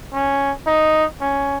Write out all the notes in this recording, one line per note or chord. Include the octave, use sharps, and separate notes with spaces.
C#4
D#4
C#4